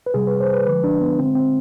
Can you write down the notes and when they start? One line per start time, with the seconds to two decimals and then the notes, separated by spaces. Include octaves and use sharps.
0.06 B4
0.14 C3 G3 G#4
0.27 B4
0.40 C5
0.54 B4
0.66 D3 F3 G#3 B4
0.84 D4
1.01 B3
1.19 D3 G#3 C4
1.35 C4